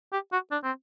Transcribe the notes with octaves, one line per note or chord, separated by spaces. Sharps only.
G4
F#4
D4
C4